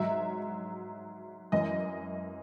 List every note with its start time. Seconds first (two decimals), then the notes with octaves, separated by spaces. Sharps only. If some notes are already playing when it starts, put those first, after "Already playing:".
Already playing: G#2 F#3 E5
1.52 F#2 E3 D#5